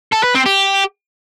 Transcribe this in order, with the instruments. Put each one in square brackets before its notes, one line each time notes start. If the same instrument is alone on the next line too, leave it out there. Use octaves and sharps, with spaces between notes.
[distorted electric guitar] A4
B4
C4
G4